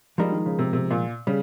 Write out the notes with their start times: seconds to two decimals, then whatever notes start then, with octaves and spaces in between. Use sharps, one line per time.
0.18 F3 G3 G#3 D#4 A#4
0.32 D#3
0.46 C#3
0.59 C3
0.73 C3
0.91 A#2
1.27 C#3 G3